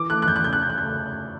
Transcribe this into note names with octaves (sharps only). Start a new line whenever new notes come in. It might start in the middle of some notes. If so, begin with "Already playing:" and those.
Already playing: E3 D6
A3 F#6
F#6
E2 G6
F#6
C#3 G6
F#6
C#3 G6
F#6
A3 G6